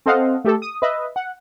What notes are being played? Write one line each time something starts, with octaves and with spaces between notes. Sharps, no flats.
C4 A4 C5 D#5 F5 F#5
A3 G4 A4
D#6
B4 D#5 E5
F#5